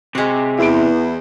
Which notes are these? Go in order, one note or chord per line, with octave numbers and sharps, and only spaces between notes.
C3 G#3 F#4
E2 E4 D7